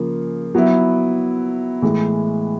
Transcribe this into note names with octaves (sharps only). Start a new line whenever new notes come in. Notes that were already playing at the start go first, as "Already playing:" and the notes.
Already playing: C#3 F3 A#3 G#4
F#3 B3 E4
A2 E3 G#3